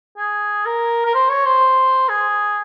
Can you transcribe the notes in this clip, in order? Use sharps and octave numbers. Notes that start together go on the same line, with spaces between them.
G#4
A#4
A#4
C5
C#5
C5
G#4